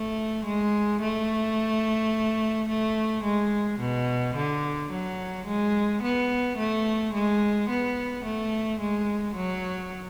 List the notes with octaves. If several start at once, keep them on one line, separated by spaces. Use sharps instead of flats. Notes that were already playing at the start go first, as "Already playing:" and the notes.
Already playing: A3
G#3
A3
A3
G#3
B2
D3
F#3
G#3
B3
A3
G#3
B3
A3
G#3
F#3